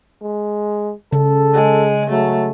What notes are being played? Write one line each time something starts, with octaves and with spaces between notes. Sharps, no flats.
G#3
C#3 A4
G#3
F#3 A3